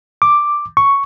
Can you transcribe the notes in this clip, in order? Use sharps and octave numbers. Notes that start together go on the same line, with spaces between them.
D6
C#6